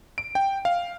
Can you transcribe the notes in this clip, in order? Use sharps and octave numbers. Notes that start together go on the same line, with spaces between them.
D7
G5
F5